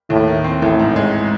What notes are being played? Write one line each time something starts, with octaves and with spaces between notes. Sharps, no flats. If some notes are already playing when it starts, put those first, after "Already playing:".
D#2 A2
D#3
C4
A1 A2
G#2
G#3